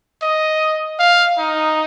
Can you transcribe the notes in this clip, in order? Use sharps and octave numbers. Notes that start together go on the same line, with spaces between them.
D#5
F5
D#4